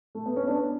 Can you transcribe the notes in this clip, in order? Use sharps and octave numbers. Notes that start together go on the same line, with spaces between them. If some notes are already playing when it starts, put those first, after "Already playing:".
A3
B3
C#4
B3 D4